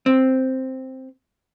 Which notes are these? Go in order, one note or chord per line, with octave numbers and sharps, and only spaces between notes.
C4